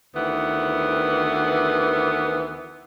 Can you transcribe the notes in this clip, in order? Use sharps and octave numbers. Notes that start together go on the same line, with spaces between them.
D2 D#3 E3 B3 F#5